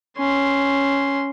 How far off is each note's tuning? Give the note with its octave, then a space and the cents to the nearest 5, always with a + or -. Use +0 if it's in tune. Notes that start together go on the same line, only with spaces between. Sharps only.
C#4 +0 C6 +0